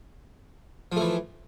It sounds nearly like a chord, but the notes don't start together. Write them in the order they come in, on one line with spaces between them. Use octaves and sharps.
F3 A3 E3